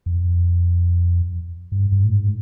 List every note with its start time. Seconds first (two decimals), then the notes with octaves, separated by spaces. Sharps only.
0.06 F2
1.72 G2
1.92 G2
2.04 A2
2.13 G#2